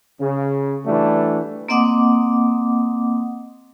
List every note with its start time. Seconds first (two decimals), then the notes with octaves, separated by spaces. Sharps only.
0.21 C#3
0.86 E3 G3 A3 D4 F#4
1.69 A#3 C4 D#5 F#5 D6 D#6